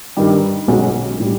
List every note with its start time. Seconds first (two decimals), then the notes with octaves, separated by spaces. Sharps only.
0.17 G2 D#3 G3
0.68 B1 B2 G#3 C#4 F#4
1.20 A2 E3 G3